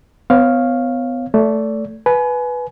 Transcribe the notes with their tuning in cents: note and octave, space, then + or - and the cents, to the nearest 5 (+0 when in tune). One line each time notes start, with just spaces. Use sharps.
B3 +30 C#5 -15 F5 +0
A3 +0 D5 -30
B4 +0 G#5 +30